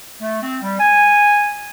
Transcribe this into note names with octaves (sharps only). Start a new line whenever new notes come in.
A3
C4
G3
G#5